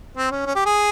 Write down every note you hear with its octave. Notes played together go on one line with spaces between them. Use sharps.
C4
C#4
C#4
G4
G#4